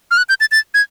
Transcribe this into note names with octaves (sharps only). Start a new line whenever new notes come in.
F6
F#6
G6
A6
A6
G#6